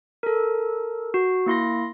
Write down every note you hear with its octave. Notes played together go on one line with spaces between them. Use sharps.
A4 A#4
F#4
A#3 E4 C6 A#6